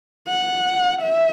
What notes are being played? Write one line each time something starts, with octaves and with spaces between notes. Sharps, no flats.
F#5
E5